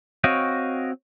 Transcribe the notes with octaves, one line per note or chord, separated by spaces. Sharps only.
C4 F#4 C#5 D#5 F5 G5